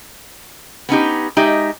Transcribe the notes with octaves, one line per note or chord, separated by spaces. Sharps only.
B3 C#4 D#4 G4
G#3 D#4 G4 D5 E5